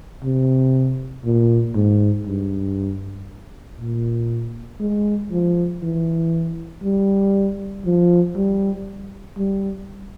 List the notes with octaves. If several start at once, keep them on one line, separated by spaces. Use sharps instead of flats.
C3
A#2
G#2
G2
A#2
G#3
F3
E3
G3
F3
G3
G3